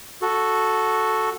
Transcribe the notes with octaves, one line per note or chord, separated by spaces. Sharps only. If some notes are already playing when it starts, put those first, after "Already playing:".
F#4 A4